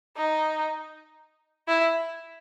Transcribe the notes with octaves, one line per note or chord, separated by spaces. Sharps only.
D#4
E4